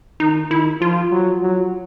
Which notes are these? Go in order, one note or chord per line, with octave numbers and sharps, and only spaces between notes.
D#3 D#4
D#3 E4
F3 F4
F#3
F#3